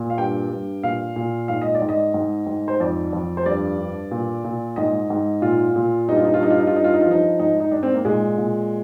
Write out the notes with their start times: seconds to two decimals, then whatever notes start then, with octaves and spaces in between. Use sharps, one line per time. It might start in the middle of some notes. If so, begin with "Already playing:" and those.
Already playing: A#2
0.10 F5
0.18 G2 G5
0.50 G2
0.83 A#2 F5
1.16 A#2
1.48 G#2 F5
1.61 D#5
1.75 D5
1.82 G#2
1.89 D#5
2.14 G#2
2.47 G#2
2.68 C5
2.80 F2 D5
3.13 F2
3.37 C5
3.46 G2 D5
3.79 G2
4.11 A#2
4.44 A#2
4.76 G#2 D#5
5.10 G#2
5.42 A#2 F4
5.76 A#2
6.08 G2 D#4
6.16 F4
6.25 D#4
6.34 F4
6.41 G2 D#4
6.50 F4
6.59 D#4
6.67 F4
6.74 G2 D#4
6.84 F4
6.94 D#4
7.01 F4
7.06 F3 D#4
7.39 G#2 D#4
7.60 D#4
7.71 G#2 D4
7.83 C4
7.94 A#3
8.05 A#2 G#3
8.38 A#2